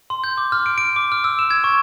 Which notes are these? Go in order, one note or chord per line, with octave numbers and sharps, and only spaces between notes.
C6
G6
D6
F6
D7
D7
D6
F6
E6
E7
G#6
C#6